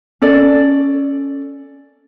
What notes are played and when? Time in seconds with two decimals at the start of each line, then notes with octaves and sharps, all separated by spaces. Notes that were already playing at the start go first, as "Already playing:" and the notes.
0.22 C#4 A4 D5